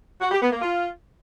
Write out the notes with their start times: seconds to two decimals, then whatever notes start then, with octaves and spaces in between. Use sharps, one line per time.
0.21 F#4
0.31 G4
0.41 B3
0.52 A#3
0.62 F4